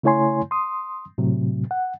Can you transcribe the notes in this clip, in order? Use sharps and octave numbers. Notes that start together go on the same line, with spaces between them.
C#3 A3 E4 C#5 G#5 C6
C6 D#6
A2 C3 F#3
F#5